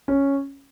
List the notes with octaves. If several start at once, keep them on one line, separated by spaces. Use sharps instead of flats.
C#4